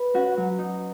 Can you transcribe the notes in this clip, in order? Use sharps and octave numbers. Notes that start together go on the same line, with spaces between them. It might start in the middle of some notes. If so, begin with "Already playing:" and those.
Already playing: B4 B5
C#4 F#4 F#5
F#3
D#4